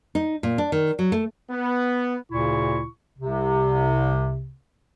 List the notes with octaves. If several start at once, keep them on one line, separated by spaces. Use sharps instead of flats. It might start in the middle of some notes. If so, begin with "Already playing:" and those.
D#4
A#2
D4
D#3
F#3
A3
B3
D2 A#2 C#3 E4 C#6
C2 C3